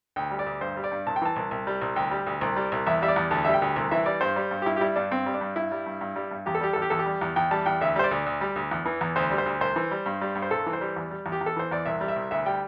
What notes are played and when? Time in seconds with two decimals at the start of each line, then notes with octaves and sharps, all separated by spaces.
0.16 D2 G5
0.31 G3
0.39 D5
0.46 D2
0.61 G2 C5
0.77 G3
0.84 D5
0.92 G2
1.06 C2 A5
1.16 G5
1.22 E3 A5
1.36 C2
1.51 C2
1.67 G3
1.81 C2
1.96 D2 G5
2.11 G3
2.26 D2
2.41 C2
2.56 G3
2.72 C2
2.86 E2 E5
3.02 G3 E5
3.08 D5
3.16 E2
3.31 D2 A5
3.45 G3 E5
3.54 G5
3.62 D2
3.76 C2
3.91 E3 E5
4.06 G3 D5
4.21 G2 C5
4.36 G3
4.51 G2
4.62 G4
4.66 G2 E4
4.76 G4
4.81 G3 E4
4.96 G2 D4
5.11 G2 C4
5.26 G3
5.34 D4
5.41 G2
5.56 G2 E4
5.72 G3
5.86 G2
6.01 G2
6.16 G3
6.31 G2
6.46 E2 G4
6.55 A4
6.61 G3 G4
6.73 E2 A4
6.82 G4
6.90 E2 A4
6.99 G4
7.06 G3
7.21 E2
7.36 E2 G5
7.51 G3 A5
7.66 E2 G5
7.81 D2 E5
7.96 G3 C5
8.04 D5
8.11 D2
8.26 D2
8.41 G3
8.56 D2
8.71 E2
8.85 E3
9.01 E2
9.16 D2 C5
9.31 G3
9.38 C5
9.46 D2
9.61 C2 C5
9.76 E3
9.91 G3
10.06 G2
10.21 G3
10.35 G2
10.42 C5
10.51 C2 A4
10.66 E3
10.73 C5
10.81 G3
10.96 E2
11.11 G3
11.26 E2
11.32 G4
11.41 E2
11.46 A4
11.56 E3 C5
11.71 E2 D5
11.86 C2 E5
12.01 G3
12.08 E5
12.16 C2
12.31 D2 E5
12.46 G3 G5